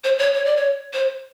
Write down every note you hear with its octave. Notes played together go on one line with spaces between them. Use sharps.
C5
C#5
C#5
D5
C#5
C5